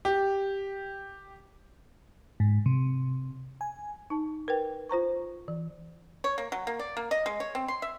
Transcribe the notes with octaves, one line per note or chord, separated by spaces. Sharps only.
G4
G#2
C3
G#5
D#4 A5
A#4 B4 G5
F4 C5 A#5 C#6
E3
C#5
A#3
F#3
A#3
D5
A#3
D#5
G#3
C#5
C4
C6
E5